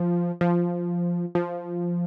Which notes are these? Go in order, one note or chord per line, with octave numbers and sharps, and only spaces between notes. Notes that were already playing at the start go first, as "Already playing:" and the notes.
Already playing: F3
F3
F3